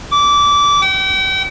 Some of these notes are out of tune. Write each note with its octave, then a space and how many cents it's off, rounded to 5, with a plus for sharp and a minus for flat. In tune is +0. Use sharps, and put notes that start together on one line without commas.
D6 -20
G5 -40